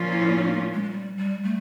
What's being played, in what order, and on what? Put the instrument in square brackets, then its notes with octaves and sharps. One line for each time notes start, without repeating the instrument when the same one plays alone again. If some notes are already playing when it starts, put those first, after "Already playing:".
Already playing: [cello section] A#2 F3 A#3 C#4 F4
[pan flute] E4
D#4
A3
G#3
G#3
G3
G3
A3